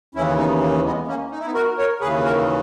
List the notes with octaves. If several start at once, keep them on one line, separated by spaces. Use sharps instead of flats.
D#2 C#3 E3 C#4 E4
B3 D#4
A#3
G#3 B3
A#3 C#4
D#4
E4
B3 D#4
F#4 A#4
A#4 C#5
D#2 C#3 E3 G#4 B4
F#4 A#4